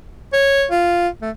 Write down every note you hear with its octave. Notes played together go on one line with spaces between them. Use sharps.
C#5
F4
A3